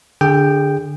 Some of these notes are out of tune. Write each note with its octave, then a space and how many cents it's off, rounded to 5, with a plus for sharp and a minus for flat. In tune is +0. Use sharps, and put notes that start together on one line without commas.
D3 +0 G#4 -35 G5 +0